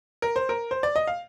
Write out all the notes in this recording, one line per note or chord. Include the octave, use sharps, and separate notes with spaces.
A#4
C5
A#4
C5
D5
D#5
F5